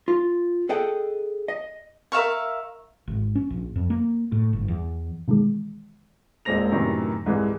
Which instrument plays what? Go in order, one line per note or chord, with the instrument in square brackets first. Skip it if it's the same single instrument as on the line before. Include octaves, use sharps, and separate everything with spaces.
[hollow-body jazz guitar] F4
G#4 A4 D#5 F#5 G5
D#5
[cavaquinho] A#4 E5 F5 C#6
[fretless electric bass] G#1
C#4
A#1
F2
A#3
A2
G1
E2
[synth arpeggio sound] B2 D#3 E3 G#3
[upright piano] E1 A#2 G#3 C4 A#6 F7
F#2 A2 C3 D#3 E3
C2 G#2 E3 G#3